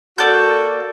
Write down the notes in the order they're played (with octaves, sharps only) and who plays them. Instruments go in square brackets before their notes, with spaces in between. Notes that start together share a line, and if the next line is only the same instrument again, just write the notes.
[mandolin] A#3 D5 G6 [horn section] F#4 A4